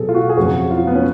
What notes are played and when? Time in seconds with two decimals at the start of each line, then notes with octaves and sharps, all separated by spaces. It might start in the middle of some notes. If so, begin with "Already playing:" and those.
Already playing: B2 F#3 G#4 A4
0.09 F4
0.15 F#4
0.29 G#4
0.37 F2 C#3 F#3 F#4
0.71 F4
0.87 B3
0.95 C#4